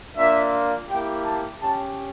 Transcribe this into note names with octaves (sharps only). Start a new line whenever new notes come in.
A#3 D4 F4 E5
A#3 E4 G4 G5
A5
C#4 G4 A5